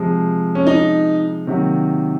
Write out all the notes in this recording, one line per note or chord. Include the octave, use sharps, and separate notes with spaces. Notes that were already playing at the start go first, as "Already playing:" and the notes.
Already playing: C3 F3 G#3
C#4
D#4
C3 D#3 F#3 A#3